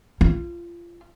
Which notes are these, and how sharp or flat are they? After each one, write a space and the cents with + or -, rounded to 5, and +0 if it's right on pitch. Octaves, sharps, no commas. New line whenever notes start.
F4 -25